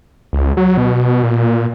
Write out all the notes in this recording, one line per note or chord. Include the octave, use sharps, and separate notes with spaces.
C#2
F#3
B2
A#2